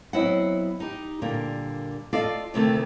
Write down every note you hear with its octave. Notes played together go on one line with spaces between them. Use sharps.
F#3 B3 C4 E4 D#5 F#5
D#4 G4
A#2 D3 G3 A#3
F4 A4 D5 D#5 F5
D2 C3 D#3 G3 A3